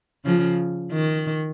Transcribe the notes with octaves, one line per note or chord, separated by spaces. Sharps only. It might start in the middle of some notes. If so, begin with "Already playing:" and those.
C#3 F3
D#3